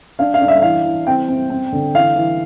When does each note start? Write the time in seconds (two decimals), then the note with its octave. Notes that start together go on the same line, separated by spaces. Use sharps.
0.19 D4 F5
0.34 F5
0.41 D4
0.48 E5
0.62 E3 F5
0.84 E3
1.07 C4 G5
1.28 C4
1.50 C4
1.73 D3
1.94 E3 F5
2.16 E3